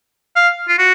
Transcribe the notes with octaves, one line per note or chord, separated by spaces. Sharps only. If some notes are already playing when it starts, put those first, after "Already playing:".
F5
F4
F#4